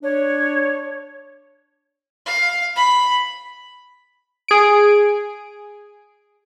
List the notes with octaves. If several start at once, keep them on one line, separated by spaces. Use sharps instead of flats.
D4 C#5
F5
B5
G#4 D7